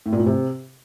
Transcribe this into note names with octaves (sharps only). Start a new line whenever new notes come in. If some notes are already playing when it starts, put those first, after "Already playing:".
A2
A#2
A2
C3